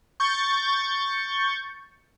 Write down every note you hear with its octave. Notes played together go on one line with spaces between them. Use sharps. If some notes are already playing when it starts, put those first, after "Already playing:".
C#6 G6 A6